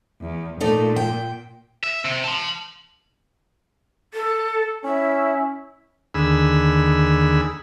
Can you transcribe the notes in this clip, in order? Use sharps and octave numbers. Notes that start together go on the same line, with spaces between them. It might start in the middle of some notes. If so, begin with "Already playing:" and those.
E2
A#2 A3 D#4 D5
G5
E5
C3
A5 C6
A4
C#4 E4
D#2 D3 G#4 B5 E6